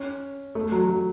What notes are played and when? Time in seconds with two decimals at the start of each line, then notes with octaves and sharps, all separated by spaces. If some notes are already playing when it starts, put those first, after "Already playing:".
Already playing: C#4
0.55 A3
0.72 F#3
0.89 F#3